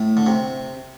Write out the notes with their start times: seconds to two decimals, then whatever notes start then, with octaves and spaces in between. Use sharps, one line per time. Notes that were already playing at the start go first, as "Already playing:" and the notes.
Already playing: A2
0.17 D3
0.27 C3